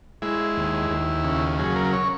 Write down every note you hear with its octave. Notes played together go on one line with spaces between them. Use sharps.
G#3 E4
D#2
D#2
C#3
F#3 G#4
A#4
C#5